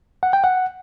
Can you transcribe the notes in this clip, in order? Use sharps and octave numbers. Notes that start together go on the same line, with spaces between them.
F#5
G5
F#5